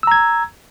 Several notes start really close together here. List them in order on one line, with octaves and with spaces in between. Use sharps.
E6 A#5 G#6